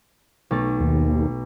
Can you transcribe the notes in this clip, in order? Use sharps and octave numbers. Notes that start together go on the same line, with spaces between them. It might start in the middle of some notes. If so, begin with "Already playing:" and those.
B1 A3 A6
D#2